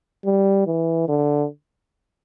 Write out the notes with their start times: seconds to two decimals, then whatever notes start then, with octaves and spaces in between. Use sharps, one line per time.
0.25 G3
0.67 E3
1.08 D3